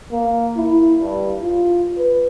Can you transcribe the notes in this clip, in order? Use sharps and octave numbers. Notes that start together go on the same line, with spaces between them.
A#3
E4
G2
F4
B4